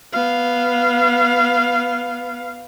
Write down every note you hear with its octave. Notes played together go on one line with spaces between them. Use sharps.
B3 F5